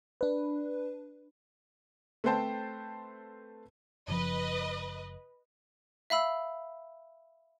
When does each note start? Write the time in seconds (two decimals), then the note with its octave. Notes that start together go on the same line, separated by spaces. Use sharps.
0.21 D4 B4
2.24 A3 C4 B4 C5 G5 A5
4.08 F#1 C#3 F3 B4 D#5
6.10 E5 F5 B5 E6